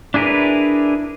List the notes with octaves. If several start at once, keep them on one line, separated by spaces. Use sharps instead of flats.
D4 E4 G#4 A#4 B4